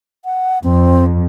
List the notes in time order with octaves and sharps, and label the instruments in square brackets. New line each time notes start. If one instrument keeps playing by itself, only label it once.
[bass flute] F#5
[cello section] F2 [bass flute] C4